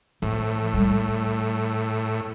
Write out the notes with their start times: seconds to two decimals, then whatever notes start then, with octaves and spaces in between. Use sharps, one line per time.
0.22 A2 F3
0.74 G3 A3